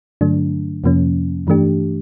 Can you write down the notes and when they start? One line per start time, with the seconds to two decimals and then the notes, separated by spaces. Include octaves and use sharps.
0.21 G2 D3 F#3 A3 D4
0.84 F2 C3 F3 A#3 C#4
1.47 G2 E3 A3 D4 G4